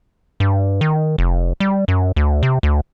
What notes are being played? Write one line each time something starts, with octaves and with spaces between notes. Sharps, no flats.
G2
D#3
F1
G3
F#2
D2
C3
D2